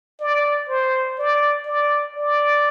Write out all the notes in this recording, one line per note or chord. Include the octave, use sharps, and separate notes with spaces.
D5
C5
D5
D5
D5